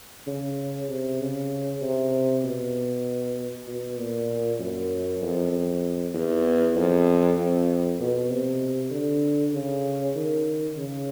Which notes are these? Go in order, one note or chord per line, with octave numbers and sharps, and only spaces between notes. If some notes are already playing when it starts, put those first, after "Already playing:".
C#3
C3
C#3
C3
B2
B2
A#2
F#2
F2
F2
E2
F2
F2
B2
C3
D3
C#3
D#3
C#3